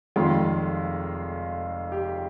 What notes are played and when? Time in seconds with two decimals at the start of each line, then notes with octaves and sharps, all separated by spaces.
0.16 F1 F2 D#3 G#3 F4
1.92 G4